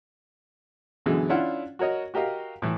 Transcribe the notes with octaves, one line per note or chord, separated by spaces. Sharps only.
F#2 B2 D3 E3 G#3
C#4 D4 E4 F4 F#5
F#4 A#4 C#5 D#5
F#4 G4 A#4 D#5 F5
A2 E3